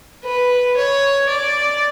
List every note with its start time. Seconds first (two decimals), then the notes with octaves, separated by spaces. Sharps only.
0.24 B4
0.77 C#5
1.29 D5